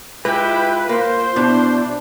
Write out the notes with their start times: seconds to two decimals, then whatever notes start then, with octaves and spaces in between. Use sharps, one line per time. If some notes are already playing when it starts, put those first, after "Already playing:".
0.25 G#3 E4 F4 G4 B4 G5
0.89 A#3 C5
1.36 B2 D4 E4